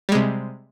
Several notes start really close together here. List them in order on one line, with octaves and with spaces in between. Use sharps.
G3 G#3 C3